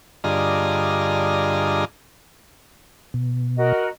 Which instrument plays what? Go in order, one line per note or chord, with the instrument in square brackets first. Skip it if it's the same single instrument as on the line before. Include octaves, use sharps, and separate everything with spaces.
[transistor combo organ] G2 D3 F4 G#4 D#5 A#5
[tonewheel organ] B2
[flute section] F#4 A#4 D#5